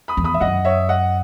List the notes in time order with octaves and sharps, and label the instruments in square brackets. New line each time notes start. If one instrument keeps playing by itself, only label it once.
[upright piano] B5 D#6
[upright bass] E2
[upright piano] B5 D#6
E5
[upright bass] F#2 [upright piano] D#5 F#5
[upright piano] C#5 E5
D#5 F#5